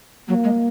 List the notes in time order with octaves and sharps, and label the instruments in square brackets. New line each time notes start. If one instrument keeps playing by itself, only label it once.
[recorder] F#3 [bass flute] A#3
[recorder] G#3